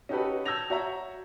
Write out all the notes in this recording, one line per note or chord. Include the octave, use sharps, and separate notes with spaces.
C#4 D#4 F#4 G4 A4 B4
A5 E6 G6 G#6 A#6 F7
F#4 C#5 E5 A#5